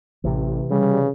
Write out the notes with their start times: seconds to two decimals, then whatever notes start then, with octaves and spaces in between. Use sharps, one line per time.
0.24 A1 C3 E3
0.71 C#3 G3